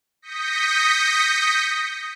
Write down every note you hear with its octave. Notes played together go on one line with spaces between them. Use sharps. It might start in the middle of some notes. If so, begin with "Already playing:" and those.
D#6 G6 A#6 B6 C#7